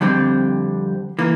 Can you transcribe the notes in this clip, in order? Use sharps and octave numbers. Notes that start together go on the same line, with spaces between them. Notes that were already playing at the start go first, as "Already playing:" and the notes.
F2 D3 G3 C4
E3 A#3